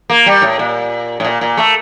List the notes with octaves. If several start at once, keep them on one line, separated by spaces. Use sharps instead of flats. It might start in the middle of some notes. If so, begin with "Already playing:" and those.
A#3
G3
A2
A#2
A2
A#2
A#2
A3